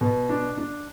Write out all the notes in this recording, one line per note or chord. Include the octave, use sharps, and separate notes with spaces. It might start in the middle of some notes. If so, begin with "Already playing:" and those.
B2
D4
D4